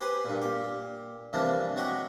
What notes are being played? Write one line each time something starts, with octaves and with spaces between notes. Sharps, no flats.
G4 B4 C5 G#5
G2 A#2
A#2 G4
G2 C3 E3 F3 A#3 D4
F#3 G#3 F#4 G4